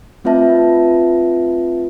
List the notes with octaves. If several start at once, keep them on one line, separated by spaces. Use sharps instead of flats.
A3 C4 F4 B4 E5 A5